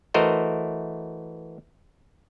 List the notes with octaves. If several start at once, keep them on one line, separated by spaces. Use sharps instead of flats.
E3 A3 F#4 A#4 C5 D#5